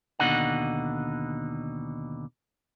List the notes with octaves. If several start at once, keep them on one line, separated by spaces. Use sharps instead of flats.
D#2 B2 D3 D#4 F#5